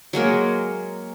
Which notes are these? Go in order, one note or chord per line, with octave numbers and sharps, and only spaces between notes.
F#3 G#3 A#3 A#4